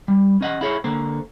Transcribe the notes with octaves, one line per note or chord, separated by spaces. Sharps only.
G3
C#4 D#5 F#5
E4 G#4 C#5
D3 A#3 C5